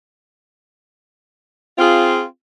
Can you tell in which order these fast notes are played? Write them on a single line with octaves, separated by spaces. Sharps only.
C4 F4 G#4